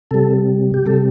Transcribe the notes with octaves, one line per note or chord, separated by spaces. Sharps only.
C3 G3 A4
G4
C3 G3 A4